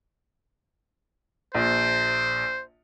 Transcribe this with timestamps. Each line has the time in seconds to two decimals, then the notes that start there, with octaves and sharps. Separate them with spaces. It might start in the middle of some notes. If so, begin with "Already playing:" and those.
1.55 A#1 C5